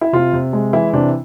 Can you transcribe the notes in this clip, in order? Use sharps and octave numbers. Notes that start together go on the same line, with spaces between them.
E4
C3 F4
C3
G#3
E3 E4
C3 D4